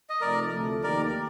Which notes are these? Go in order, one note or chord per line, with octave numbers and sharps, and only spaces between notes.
D#5
C3 F3 A3 D#4 A#4 D5
D2 C3 F3 A3
D#2 D#3 A#3 D#4 G4 A#4 D5